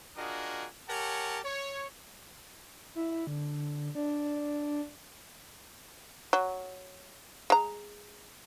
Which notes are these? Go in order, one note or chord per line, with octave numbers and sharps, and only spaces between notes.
D4 F4 F#4 G#4 A#4 D#5
G4 A#4 C#5 F#5 G#5 A5
C#5
E4
D3
D4
F#3
G#3 A#5